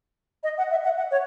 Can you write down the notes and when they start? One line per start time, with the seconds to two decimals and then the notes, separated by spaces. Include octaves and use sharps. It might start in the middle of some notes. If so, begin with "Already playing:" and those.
0.44 D#5
0.58 F#5
0.71 E5
0.84 F#5
0.97 F#5
1.11 C#5